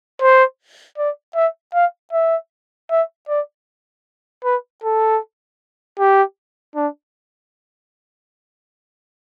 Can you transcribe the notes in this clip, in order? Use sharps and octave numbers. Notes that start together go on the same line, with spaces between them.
C5
D5
E5
F5
E5
E5
D5
B4
A4
G4
D4